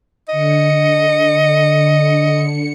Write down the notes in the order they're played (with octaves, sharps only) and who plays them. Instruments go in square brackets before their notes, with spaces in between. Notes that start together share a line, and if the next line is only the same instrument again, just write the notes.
[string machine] D3 C#7 [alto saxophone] D#5